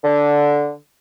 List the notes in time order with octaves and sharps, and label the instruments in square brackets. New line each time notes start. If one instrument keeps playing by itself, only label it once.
[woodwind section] D3